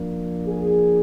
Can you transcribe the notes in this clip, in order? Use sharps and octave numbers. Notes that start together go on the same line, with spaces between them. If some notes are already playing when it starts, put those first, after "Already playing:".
Already playing: F3 A#3 D4
G#4